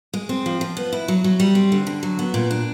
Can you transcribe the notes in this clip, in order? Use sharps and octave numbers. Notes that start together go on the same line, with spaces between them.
G#3
C4
F3
F3
B3
E4
F#3
F#3
G3
C4
D3
D3
F#3
B3
A#2
D4